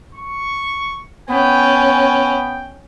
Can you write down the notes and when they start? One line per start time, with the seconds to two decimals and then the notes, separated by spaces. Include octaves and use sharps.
0.15 C#6
1.29 B3 C#4 G5